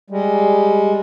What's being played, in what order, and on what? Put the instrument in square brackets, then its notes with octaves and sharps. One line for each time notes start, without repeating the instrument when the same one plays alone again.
[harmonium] G3 G#3